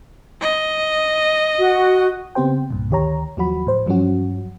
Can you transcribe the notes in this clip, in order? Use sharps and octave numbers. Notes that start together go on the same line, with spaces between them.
D#5
F#4
C#3 B3 C4 G4 C5 G5
C2 G2 A#2
D2 D#3 G4 C#5 A#5
D#2 F3 F#3 F#4 B5
A2 C5
G2 F3 F#3 C#4 F#4